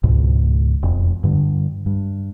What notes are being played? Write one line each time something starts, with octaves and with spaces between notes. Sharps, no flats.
C#2 G#2 B2
E1 F2
G2 D3 G3
G2